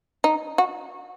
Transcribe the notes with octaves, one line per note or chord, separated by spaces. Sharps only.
D#4
F#4